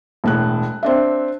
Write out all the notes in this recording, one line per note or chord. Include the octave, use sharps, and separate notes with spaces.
E1 A2 F#6
C4 D4 E5